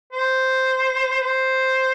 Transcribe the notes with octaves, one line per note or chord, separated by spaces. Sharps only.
C5
C5